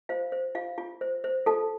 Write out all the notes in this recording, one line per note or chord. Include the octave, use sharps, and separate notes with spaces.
F4 C5 F5
C5
F4 F5
F4
C5
C5
F4 A4 A5